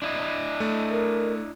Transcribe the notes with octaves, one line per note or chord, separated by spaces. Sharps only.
D4 E4 D#5
A3
A#4